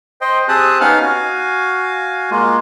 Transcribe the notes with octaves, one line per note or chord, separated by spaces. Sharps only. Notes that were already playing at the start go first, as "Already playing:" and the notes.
C5 D#5 G5
C4 G4 G#4 A5 D#6 F#6
B3 C#4 D#4 F5 F#5 F6
F#4 F5 G#5
G#3 A#3 F4